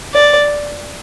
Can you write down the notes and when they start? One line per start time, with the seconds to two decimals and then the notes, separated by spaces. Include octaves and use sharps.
0.14 D5